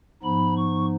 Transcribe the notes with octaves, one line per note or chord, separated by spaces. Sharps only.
G#2 F3 B3 D#4 B5
C#6